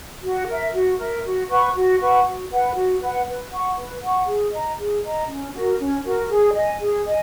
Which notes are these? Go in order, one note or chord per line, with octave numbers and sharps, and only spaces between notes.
F#4
A#4 E5
F#4
A#4 E5
F#4
B4 F#5 C#6
F#4
B4 F#5 C#6
F#4
B4 F#5
F#4
B4 F#5
B4
F#5 C#6
B4
F#5 C#6
G#4
D#5 A#5
G#4
D#5 A#5
C#4
F#4 A#4
C#4
F#4 A#4
G#4
D#5 G#5
G#4
D#5 G#5